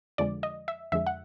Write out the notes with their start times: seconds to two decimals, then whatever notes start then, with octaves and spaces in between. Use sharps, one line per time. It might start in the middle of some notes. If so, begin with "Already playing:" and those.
0.18 F2 D3 F3 G#3 D5
0.43 D#5
0.68 E5
0.92 F2 D3 F3 G#3 E5
1.07 F#5